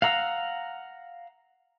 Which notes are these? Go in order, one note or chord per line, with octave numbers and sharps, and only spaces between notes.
F5 F#5 A#5 E6